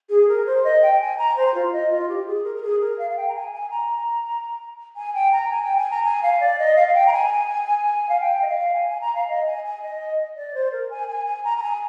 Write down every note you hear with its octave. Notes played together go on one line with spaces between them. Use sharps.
G#4
A#4
C5
D#5
G5
G#5
A#5
C5
F4
D#5
F4
G4
G#4
A#4
A#4
G#4
A#4
F5
F5
G5
A#5
G#5
G#5
A#5
G#5
G5
A#5
G#5
G5
G#5
A#5
G#5
F5
D5
D#5
F5
F5
G5
A#5
G#5
F5
G5
D#5
F5
G#5
G#5
A#5
F5
D#5
G#5
G#5
D#5
D5
C5
A#4
G#5
G#5
G#5
A#5
A#5
G#5